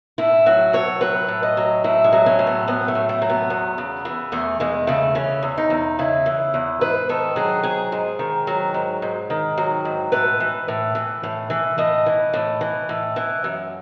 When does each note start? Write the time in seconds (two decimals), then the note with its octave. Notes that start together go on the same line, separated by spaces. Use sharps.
0.18 A2 E4
0.46 F#3 F#4
0.73 A2 C#5
1.01 F#3 B4
1.28 A2
1.43 D#5
1.57 F#3
1.84 A2 E4
2.04 G#3
2.12 F#3
2.26 C#4
2.39 A2
2.47 B3
2.68 F#3 B3
2.88 A3
2.95 A2
3.09 A3
3.22 F#3
3.29 B3
3.50 E2
3.78 C#3
4.05 E3
4.32 E2 A3
4.60 E2 G#3
4.87 C#3 A3
5.15 E3 C#4
5.43 E2
5.58 D#4
5.70 E2
5.99 C#3 E4
6.26 E3
6.54 E2
6.81 G#2 B4
7.09 D#3 A4
7.36 F#3 G#4
7.63 G#2 G#4
7.92 G#2
8.19 D#3
8.47 F#3
8.74 G#2
9.02 G#2
9.30 D#3
9.58 F#3
9.85 G#2
10.12 A2 B4
10.40 E3
10.68 A2
10.95 E3
11.23 A2
11.50 E3
11.78 A2 D#5
12.06 E3
12.34 A2
12.61 E3
12.89 A2
13.16 E3
13.44 F#2